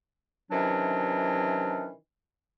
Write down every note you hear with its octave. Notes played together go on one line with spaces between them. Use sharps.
C3 D#3 E3 F#3 C#4 D4